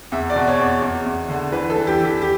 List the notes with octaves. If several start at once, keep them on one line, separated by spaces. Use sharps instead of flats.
E2 E5
D5
B2
C#5
E2
E2
E2
D3
E3 B4
A4
E3
G4
E3
G4
G4